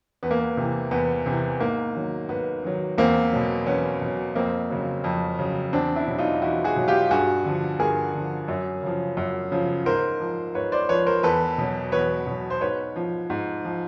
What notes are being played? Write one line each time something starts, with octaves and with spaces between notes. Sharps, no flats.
E2 B3
A#3
B3
C3 E3
E2 B3
C3 E3
G#2 A#3
D#3 F#3
G#2 B3
D#3 F#3
E2 A#3 C4
B2 F#3
E2 B3 C#4
B2 F#3
F2 A#3 C4
C#3 F#3
F2
C#3 F#3
E2 C4 D4
D4 E4
B2 F#3
D#4 F4
E2 E4 F#4
F#4 G#4
B2 F#3
F4 G4
G2 F#4 G#4
D3 F3
G2 G#4 A#4
D3 F3
F#2
C#3 F3
F#2
C#3 F3
G#2 A#4 C5
F3
G#2 B4 C#5
C5 D5
F3 B4 C#5
A#4 C5
E2 A4 B4
B2 F#3
E2 B4 C#5
B2 F#3
C5
G#2 B4 C#5
F3
G#2
F3